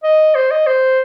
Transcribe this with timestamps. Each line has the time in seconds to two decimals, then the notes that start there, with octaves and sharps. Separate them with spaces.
0.04 D#5
0.35 C5
0.51 D#5
0.67 C5